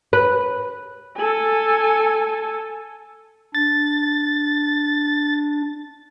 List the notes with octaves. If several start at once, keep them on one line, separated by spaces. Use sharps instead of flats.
B4
A4 G#5
D4 A6